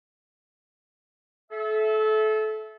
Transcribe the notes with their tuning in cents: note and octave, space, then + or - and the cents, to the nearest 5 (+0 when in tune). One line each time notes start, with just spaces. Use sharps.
A4 -30 E5 +0